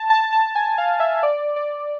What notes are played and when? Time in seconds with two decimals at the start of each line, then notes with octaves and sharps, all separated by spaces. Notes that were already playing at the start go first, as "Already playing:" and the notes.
Already playing: A5
0.10 A5
0.33 A5
0.55 G#5
0.78 F5
1.00 E5
1.23 D5
1.56 D5